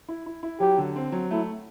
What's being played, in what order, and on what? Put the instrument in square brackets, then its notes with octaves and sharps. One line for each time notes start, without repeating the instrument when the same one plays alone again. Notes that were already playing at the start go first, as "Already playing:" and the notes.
[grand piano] E4
E4
E4
[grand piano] F#3 [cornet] G4
[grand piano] D3
C4
F#3
[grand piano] A3 [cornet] E4